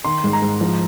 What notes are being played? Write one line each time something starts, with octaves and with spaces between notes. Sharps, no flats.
D#3 C6
G#2
A#5
G#2
F3